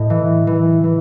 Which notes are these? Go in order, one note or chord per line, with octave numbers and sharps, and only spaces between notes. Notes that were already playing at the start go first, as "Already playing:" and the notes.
Already playing: A2 D#5
E3
E3
E3